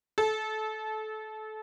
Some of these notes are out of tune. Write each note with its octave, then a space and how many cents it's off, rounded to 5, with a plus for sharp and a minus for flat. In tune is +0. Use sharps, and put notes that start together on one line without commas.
A4 -25